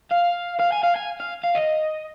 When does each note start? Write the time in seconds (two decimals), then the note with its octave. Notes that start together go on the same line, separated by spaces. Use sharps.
0.11 F5
0.60 F5
0.72 G#5
0.83 F5
0.96 G#5
1.20 F5
1.44 F5
1.55 D#5